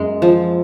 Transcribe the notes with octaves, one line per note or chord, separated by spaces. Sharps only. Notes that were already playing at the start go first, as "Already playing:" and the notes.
Already playing: F#2 G#3
F3